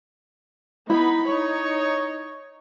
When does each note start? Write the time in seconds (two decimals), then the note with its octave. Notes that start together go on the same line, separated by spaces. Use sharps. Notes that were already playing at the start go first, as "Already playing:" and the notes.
0.90 B3 D#4 E4 B5
1.25 D#4 C#5